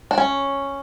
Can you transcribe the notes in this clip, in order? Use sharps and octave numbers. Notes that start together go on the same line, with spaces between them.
D4
C#4